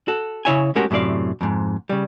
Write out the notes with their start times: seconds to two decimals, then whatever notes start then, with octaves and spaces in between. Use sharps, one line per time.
0.08 F#4 A4
0.45 C#3 E4 C#5 E5 G#5
0.75 G#3 A3 C#4 F#4 G4 A#4
0.91 F#2 A2 C3 D5 F5
1.41 F2 G#2
1.89 C#3 G3